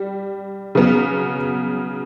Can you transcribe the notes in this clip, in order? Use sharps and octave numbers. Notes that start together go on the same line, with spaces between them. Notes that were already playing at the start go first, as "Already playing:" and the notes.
Already playing: G3
C#3 F#3 B3